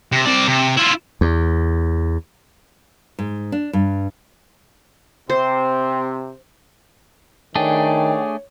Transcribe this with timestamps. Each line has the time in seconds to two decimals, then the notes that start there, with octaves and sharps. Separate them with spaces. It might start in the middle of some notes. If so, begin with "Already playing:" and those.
0.12 C3
0.25 C4 D5
0.48 C3
0.77 E4 F4
1.21 E2
3.19 G#2
3.52 D4
3.73 G2
5.30 C3 C4 C5
7.55 D#3 A3 D4 G#4 C#5 G5